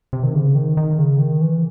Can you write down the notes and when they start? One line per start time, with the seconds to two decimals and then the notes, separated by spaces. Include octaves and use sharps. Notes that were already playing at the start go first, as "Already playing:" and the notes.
0.13 C3
0.23 D#3
0.34 C#3
0.55 D#3
0.77 D#3
0.98 C#3
1.19 D#3
1.41 E3